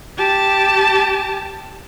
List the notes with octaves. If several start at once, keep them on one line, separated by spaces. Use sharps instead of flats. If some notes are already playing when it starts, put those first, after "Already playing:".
G4 A5